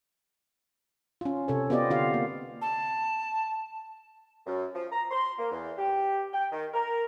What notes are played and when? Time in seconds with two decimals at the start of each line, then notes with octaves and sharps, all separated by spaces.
1.21 C#4 F4
1.48 C3 A4 C#5
1.70 B3 C4 F4 G4 D5 D#5
1.90 D3 F4 G4 F5
2.14 A#3
2.61 A5
4.47 F#2
4.75 F3
4.92 A#5
5.11 C6
5.38 A#3
5.52 E2
5.78 G4
6.33 G5
6.52 D#3
6.74 A#4